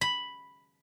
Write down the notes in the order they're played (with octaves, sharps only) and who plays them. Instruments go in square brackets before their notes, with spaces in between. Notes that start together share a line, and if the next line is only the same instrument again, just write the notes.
[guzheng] B5